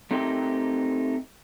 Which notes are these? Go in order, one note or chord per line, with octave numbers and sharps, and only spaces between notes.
A3 C4 D#4 G4 A#4 G5